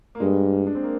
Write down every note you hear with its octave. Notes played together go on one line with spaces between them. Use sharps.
A#3
G2 G#3
D4
C4
A#3